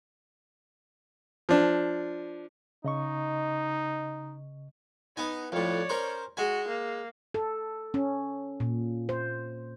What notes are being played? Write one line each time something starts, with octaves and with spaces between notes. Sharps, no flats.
F3 D4
C#3 D#4 D#5 C#6
B3 D#4 G#5
F2 A2 C#5 D5
C#4 A#4 C5
G#3 F#4 G#5
A#3
A4
C#4
A#2
C5